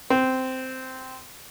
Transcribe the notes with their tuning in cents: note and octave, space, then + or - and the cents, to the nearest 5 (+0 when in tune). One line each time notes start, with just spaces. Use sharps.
C4 -10